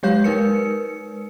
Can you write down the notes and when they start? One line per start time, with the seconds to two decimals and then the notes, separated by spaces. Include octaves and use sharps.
0.03 F#3 G#3 G4 C#5 F5 G6
0.24 G#3 D#4 A#4 B4 C#7